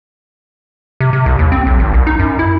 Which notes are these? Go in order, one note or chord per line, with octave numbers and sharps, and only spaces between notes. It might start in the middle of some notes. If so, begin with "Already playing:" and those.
C3
C3
C2
D#2
C4
B1
G#1
C2
D#4
F#2
E4